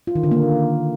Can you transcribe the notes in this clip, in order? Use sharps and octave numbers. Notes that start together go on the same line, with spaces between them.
F4
D#3
D3
A#3